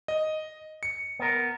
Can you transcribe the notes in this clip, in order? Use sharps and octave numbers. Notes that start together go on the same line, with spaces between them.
D#5
C#7
B3 A#4